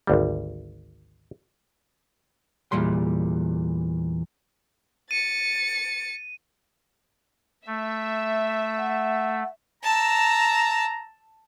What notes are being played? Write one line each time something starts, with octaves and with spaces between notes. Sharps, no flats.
G#1 D2 G3
E2 A#2 G3 C6
A6 C#7 D#7
A3 E5
F#5
A5 A#5 E6